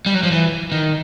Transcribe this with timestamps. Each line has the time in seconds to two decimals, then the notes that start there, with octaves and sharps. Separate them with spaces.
0.06 G3
0.14 F#3
0.23 F3
0.31 E3
0.72 D#3